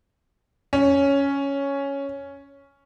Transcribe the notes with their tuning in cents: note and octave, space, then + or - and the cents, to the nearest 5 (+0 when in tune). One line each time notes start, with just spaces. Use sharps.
C#4 +5